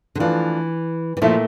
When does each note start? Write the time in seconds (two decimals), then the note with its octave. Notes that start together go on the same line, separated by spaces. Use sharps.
0.15 D3
0.19 E3 F3 A3 D4 F4
1.17 E3
1.22 A#2 F3 A3 E4